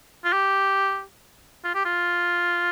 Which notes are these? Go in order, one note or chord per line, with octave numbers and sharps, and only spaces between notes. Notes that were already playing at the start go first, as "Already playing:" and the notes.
F4
G4
F4
G4
F4